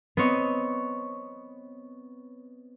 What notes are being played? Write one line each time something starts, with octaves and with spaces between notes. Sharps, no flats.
B3 C4 C#5 D#5